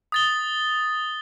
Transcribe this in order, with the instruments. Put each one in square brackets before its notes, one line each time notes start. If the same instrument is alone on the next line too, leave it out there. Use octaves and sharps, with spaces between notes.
[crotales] D#6 A6 G7